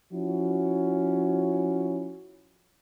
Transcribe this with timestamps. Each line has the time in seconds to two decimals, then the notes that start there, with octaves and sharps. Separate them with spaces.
0.13 F3 C#4 E4 F#4